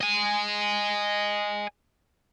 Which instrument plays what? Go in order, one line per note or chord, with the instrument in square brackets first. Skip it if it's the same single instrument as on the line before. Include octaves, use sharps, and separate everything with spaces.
[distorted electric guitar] D#5 G#5